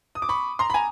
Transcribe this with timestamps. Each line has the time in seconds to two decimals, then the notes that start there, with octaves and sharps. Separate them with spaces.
0.15 D#6
0.22 D6
0.29 B5 C#6
0.59 A#5 C6
0.70 B5
0.74 G#5 A#5